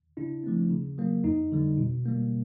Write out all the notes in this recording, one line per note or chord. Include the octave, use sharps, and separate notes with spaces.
C#3 D4 E4
F3 A3 C4
C#3
F#3 A#3
F2 D#4
D3 G3
B2
G3 A#3